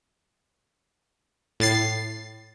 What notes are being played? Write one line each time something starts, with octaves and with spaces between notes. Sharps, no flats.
A2 A6 C7